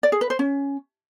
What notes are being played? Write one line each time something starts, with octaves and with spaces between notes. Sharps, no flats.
D5
G#4
B4
C5
C#4